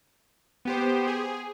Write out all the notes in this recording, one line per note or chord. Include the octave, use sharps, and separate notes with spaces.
B3 G4 C5
G#4